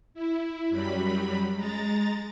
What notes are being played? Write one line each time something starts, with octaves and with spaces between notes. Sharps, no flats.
E4
F#2 F#3 G3 B5
G#3 A#5 A6